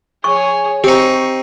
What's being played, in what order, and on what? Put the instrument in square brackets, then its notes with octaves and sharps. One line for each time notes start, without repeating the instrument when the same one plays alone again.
[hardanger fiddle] G#4 C#5 [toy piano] C#6
[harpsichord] C4 D#4 [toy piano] G4 [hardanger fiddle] C#6